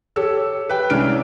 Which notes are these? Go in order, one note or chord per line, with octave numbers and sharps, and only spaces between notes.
G4 A4 C#5 E6
B4 G5
C2 G#3 C#4 D4 F6 D7